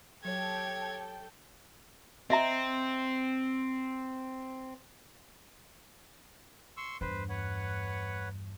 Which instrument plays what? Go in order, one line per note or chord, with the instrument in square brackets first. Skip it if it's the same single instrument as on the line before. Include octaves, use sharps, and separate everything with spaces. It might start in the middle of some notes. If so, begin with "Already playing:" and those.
[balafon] F#3 [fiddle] G4 C#5 [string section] A4 G5 [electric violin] G#6
[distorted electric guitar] C4 [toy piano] D#5 E5 A#5
[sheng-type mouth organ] C6 C#6 E6
[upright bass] E2 G2 [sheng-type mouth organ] B4 C5
[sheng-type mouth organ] B4 C#5 F#5